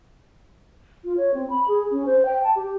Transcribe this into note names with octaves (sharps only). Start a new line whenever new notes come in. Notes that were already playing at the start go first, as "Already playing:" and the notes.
F4
C#5
C4
B5
G#4
C#4
C5
G5
A5
G4